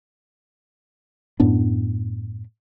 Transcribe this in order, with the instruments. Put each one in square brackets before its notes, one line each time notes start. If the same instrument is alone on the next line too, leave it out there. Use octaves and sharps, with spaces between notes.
[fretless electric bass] F#2 A2 B3 D4